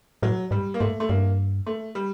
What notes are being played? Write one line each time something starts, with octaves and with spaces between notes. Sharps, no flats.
A2 F#3
G#2 G3
A#3
G#2 A3
A3
G2 A#3
A3
G3